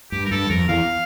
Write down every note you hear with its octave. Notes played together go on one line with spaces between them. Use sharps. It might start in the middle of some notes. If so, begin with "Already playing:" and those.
G2 G4
A#4
G2 A4
F2 A#4
E2 F5